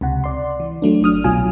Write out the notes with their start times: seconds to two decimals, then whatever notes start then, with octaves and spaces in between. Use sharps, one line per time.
0.01 C#2 C3 F#5
0.24 D5 C6
0.60 E3
0.82 F#3 A3 D4
1.02 G1 D4 D#6 F6
1.24 C2 B2 F#3 F4 G#5